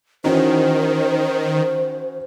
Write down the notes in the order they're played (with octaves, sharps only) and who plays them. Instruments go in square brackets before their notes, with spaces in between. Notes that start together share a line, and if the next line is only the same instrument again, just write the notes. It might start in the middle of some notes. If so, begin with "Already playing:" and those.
[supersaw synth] D#3 [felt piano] E3 C#4 F#4 [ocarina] C5